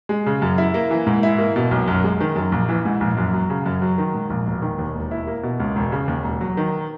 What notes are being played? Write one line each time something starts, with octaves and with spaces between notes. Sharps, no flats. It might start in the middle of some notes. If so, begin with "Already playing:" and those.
G#3
C#3
F#2
E4
A#3
E3
G#2
E4
A#3
B2
B1
F#2
G#3
D#3
F#2
A#1
E3
G#2
A#1
F#2
F#3
C#3
F#2
F#3
D#3
G#2
A#1
E1
D#3
D#2
E1
E4
A#3
B2
C#2
E1
C#3
D#2
E1
F#3
D#3